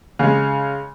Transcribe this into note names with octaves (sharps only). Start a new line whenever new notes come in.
C#3 G#3